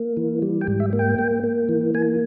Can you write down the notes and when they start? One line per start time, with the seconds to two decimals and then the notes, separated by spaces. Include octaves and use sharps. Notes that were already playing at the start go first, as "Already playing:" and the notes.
Already playing: A#3
0.17 E3
0.42 G3
0.61 G5
0.68 G#2
0.80 E5
0.93 A#3
0.99 G5
1.18 A#3
1.44 A#3
1.69 E3
1.94 A#3 G#5